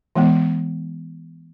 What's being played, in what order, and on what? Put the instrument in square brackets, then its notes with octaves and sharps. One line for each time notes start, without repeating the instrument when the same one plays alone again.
[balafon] E3 G#3 B3